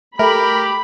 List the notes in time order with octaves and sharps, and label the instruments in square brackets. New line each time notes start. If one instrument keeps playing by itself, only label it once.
[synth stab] A3 [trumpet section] G4 [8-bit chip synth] A#4 [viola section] B5